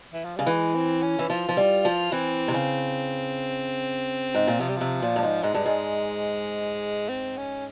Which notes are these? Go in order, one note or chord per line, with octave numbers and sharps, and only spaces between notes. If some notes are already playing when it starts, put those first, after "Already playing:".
E3
F3
C#3 G3
E3 G#3
C4
C#4
E3
F3 F4
F3
G3
F3
E3 C4
C3
C#3
G#2
A#2
C3 F3
G3
C3 F3
A#2
G2
G#2
G#2 G#3
G2
G#2
C4
C#4